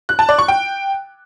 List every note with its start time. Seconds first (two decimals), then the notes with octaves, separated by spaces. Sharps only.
0.09 F#6
0.19 A5
0.29 D5
0.39 C#6
0.48 G5